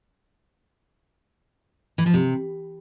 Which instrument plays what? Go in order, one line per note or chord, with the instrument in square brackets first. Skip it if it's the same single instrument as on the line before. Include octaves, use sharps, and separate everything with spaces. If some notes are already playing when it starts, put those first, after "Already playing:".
[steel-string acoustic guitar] E3
F3
C3